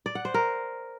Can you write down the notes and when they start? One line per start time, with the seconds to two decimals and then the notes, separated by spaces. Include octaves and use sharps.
0.06 D5
0.15 F#5
0.25 C5
0.34 A#4